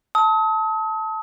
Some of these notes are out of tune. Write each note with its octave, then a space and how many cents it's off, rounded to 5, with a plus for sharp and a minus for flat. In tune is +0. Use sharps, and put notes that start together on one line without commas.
A5 +0 D#6 +40